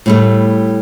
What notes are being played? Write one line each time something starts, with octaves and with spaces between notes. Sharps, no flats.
A2 G3 A3